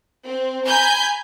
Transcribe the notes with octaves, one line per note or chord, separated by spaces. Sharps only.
C4
G#5 A#5 B5 G6